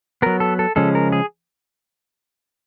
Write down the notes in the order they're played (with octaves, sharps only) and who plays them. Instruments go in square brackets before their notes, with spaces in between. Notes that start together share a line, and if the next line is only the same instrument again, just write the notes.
[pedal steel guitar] F#3 B3 A#4
A4
A4
C#3 F3 G#3 C#4 A4
A#4
G#4